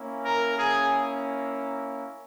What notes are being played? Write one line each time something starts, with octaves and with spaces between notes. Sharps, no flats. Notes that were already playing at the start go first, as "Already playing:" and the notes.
Already playing: A#3 C#4 E4
A#4
G#4